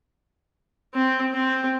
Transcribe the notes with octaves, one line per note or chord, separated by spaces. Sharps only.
C4
C4